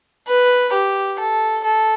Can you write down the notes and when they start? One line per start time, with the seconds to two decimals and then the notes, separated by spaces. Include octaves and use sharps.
0.28 B4
0.73 G4
1.19 A4
1.65 A4